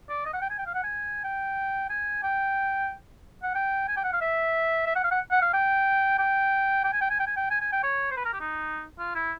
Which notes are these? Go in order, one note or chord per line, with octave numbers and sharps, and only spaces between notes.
D5
D#5
F#5
G5
G#5
G5
F5
F#5
G#5
G5
G#5
G5
F#5
G5
G#5
G5
F#5
F5
E5
E5
F#5
F5
F#5
F#5
F5
G5
G5
G5
G#5
G5
G#5
G5
G#5
G5
G#5
G#5
G5
C#5
C5
B4
A#4
G4
D#4
F4
E4